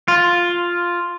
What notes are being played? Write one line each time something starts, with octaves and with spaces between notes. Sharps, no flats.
F4